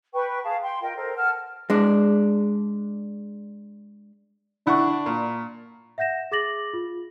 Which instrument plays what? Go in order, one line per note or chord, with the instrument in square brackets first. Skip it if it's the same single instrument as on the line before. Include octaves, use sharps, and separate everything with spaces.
[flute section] B4 G5 C#6
G#4 F5 A5
G5 C6
F4 A#4 D#5 G5
A4 A#4 C5 D#5
F#5 A5 F6
[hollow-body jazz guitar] G#3 D4
[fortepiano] D3 E4 F#5 [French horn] D4 [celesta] B5 C#6
[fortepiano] A#2
[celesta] E5 F#5 G6 A#6 E7
G#4 D6 A6 A#6 F#7
F4